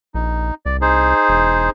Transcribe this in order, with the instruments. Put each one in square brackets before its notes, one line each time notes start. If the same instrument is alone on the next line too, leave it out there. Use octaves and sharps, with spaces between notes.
[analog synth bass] A#1 [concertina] D#4
[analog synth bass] C2 [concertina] D5
[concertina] D#4 G#4 C5
[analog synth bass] E1